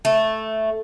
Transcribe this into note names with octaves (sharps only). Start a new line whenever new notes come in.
A3